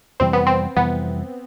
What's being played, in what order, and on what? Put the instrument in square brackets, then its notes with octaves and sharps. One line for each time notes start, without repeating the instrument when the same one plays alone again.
[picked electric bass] F2 C3 E3 G3 [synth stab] C4
[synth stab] B3
C4
[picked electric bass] F2 C3 E3 G3 [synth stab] B3